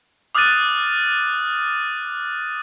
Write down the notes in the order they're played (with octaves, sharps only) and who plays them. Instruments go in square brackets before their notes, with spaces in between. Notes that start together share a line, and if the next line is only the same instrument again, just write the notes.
[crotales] D6 D#6 F6 F#6 A6 D#7